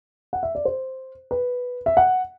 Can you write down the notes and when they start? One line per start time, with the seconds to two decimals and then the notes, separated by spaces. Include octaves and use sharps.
0.33 F#5
0.43 E5
0.55 D5
0.65 C5
1.31 B4
1.86 E5
1.97 F#5